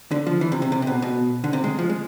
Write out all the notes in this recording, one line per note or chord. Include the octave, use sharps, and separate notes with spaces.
D3
F3
E3
C3
C3
C3
C3
B2
B2
D3
C3
G#3
F3
G#3